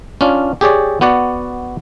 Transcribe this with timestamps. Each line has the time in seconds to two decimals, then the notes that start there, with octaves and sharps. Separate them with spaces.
0.21 C#4 D4 F4
0.61 G4 G#4 C#5 D5
1.01 B3 F#4 D5 F#5